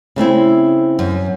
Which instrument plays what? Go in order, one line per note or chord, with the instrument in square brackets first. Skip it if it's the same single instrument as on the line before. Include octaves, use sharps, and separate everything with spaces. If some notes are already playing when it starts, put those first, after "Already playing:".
[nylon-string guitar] C#3 A3 C4 E4
F#2